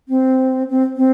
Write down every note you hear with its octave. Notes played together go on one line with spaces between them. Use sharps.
C4
C4
C4